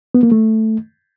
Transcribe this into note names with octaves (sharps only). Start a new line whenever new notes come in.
B3
A#3
A3